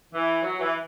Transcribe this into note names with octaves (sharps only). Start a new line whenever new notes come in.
E3
F#3
E3